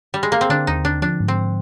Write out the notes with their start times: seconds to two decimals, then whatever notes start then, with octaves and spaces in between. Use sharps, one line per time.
0.14 G3
0.23 G#3
0.32 A#3
0.41 C4
0.50 D3 D4
0.67 D#2 D#4
0.85 D3 D4
1.02 F3 D4
1.20 G#2
1.28 C4